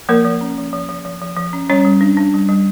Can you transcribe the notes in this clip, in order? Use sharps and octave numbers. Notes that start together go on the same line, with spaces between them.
F3 A#3 A#4
F3
C#4
F3
F3
F3
F3
F3
F3
C#4
G3 C#4 C#5
G3
D4
D4
G3
G3